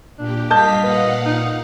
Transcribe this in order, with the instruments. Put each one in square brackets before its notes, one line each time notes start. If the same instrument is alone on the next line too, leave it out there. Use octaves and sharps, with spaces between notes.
[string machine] A#2 G4 [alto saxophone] D4
[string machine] G2 F5 B6 [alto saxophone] D#5 [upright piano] A5 G6
[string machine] A#2 F5 F#5 [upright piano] B4
[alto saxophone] D#4